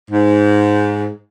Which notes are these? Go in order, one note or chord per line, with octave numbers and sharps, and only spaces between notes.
G#2